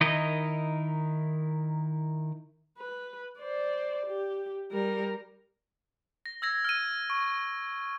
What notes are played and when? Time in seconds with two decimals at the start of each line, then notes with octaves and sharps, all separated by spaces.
0.01 D#3 D#4 E4 A#4 D#5
2.78 B4
3.39 C5 D5
4.06 G4
4.71 G3 A#4
6.26 A#6
6.42 E6 G#6 A#6
6.65 F6 D#7
7.10 C#6